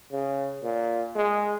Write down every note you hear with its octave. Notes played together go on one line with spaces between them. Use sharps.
C#3
A#2
G#3